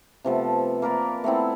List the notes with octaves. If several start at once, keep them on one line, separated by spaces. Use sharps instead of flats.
C3 F3 A3 B3
A#3 A#4 B4 D5
A3 B3 C4 E4